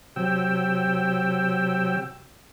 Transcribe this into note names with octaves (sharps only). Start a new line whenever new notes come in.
C3 F#3 G5 E6